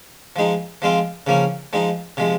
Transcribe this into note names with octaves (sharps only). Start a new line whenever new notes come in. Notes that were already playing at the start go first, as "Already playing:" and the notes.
F3 G#3 D#4
F3 G#3 C4 F4
C#3 F3 A#3 C#4
F3 G#3 D#4
C3 F3 G#3